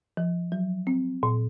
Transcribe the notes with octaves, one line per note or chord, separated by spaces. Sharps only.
F3
F#3
C4
A#2